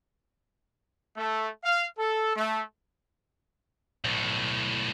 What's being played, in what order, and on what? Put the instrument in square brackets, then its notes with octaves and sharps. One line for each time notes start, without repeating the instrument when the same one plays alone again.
[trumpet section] A3
F5
A4
A3
[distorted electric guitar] B1 A2